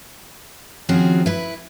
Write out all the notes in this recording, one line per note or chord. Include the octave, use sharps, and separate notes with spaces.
D#3 F3 C4 C#4 F#4 G#4
E4 B4